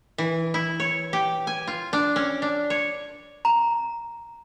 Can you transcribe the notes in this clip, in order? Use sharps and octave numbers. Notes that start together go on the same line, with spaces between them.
E3
E4
C#5
G4
G#5
F4
D4
C#4
D4
C#5
A#5